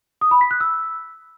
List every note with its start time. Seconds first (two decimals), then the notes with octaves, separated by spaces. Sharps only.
0.21 D#6
0.31 B5
0.41 B6
0.51 F#6
0.61 E6